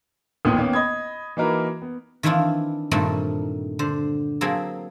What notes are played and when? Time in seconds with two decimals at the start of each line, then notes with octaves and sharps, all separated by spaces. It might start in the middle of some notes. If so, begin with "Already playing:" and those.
0.45 A1 D#2 A#2 B3 C#4 D#6
0.58 D#3 A#3 B3 C#4
0.73 D#5 B5 D#6 G#6
1.37 E3 A#3 D#4 F#4 A#4 B4
1.82 B3
2.23 D#3 E3 C4 D4 E4 F4
2.91 G2 A#2 D#3 A3 C4 D#4
3.79 D3 C5
4.41 F#3 A#3 C4 G#4 A4